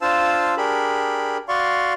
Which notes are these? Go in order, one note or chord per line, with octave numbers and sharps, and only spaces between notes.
D4 F4 C5 F5 A5 E6
D4 G4 G#4 A#4 B5
F#4 D5 F5 C6 C#6